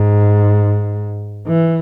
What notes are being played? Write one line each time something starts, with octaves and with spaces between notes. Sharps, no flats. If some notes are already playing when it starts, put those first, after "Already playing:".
Already playing: G#2
E3